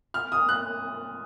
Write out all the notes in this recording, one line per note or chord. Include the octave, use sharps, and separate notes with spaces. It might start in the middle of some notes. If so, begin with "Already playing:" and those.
F6
D#6
F#6